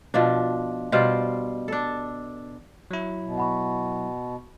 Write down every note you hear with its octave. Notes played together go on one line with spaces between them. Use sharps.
B2 F3 D4
B2 G3 F4 C5
D4 A4
F#3 E4
B2
F#5 B5 C#6